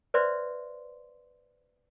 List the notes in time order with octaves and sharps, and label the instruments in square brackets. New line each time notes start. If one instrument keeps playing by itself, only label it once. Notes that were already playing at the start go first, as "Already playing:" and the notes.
[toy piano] B4 C5 D5 E5 C6